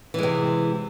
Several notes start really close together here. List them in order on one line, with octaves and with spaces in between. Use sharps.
E3 G#3 C3